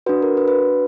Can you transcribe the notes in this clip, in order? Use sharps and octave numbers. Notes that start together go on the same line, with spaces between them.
D4 F#4 B4
A#4
B4
B4